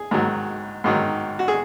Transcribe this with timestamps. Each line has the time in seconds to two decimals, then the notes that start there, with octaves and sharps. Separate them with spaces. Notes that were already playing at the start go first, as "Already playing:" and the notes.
Already playing: G#4
0.11 G#2 D#3 F#3
0.84 G#2 D#3 F#3
1.39 F#4
1.48 G#4